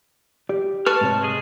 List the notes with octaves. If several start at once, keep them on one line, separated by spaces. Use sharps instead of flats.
G4 D5
B4 A5 C#6 F6
G#2 C3 C#5
G#3 G#4